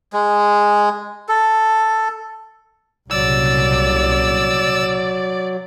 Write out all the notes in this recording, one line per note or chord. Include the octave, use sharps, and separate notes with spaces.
G#3
A4
C2 A#2 C#3 F#3 D5 E6